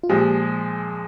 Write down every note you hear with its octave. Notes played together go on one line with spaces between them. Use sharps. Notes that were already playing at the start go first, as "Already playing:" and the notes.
F4
A#2 F3 G#3 G4